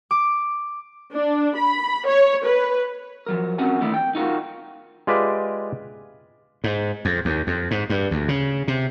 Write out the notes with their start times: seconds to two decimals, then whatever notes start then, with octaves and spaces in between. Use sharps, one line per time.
0.11 D6
1.13 D4
1.56 B5
2.06 C#5
2.44 B4
3.27 F3 F#3 A#4
3.58 C4 C#4 F#4 A#4 F#5 G#5
3.81 D3 D#3 A3 D4 E4
3.94 G5
4.15 D#4 F4 F#4 A#4
5.07 G#3 F4 G4 B4 D5 E5
6.64 G#2
7.05 F2
7.25 D#2
7.47 F2
7.71 G#2
7.90 G2
8.11 D2
8.29 C#3
8.68 C3